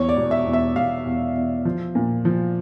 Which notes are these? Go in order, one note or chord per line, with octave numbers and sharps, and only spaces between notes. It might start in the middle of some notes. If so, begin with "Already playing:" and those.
Already playing: E2 C#5
D5
E1
E5
E2
E5
E1 F5
E2
E2
F3
A#2
F3